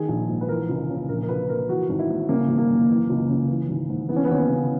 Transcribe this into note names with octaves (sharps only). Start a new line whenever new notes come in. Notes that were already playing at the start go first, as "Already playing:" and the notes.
Already playing: D#3 G#4
A#1
G#2
B4
E3 A#4
C#2
C#3
A#1 A#4
A#4
A#2 B4
A#2 A#4
E3 F#4
G#1
E4
G#2
C#3 A#3
G#1
A#3
F#2
E3
C#2
C#3
E3
G#1
G#2
E3 B3
C#4
B3
D#2 C#4
B3
C#3